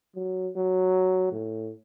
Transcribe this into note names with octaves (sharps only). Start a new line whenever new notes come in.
F#3
F#3
A2